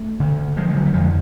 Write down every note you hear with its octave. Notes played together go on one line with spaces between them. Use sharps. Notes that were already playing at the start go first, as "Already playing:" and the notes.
Already playing: A3
D2 D3
F3 G#3
G#3
D3 F#3
A3
F2 D3 F3 G#3